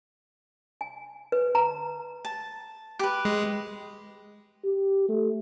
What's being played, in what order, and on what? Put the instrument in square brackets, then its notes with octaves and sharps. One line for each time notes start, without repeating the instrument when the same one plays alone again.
[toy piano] G#5
B4
A#5
[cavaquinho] A5
G4 B4
[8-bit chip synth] G#3
[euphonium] G4
A3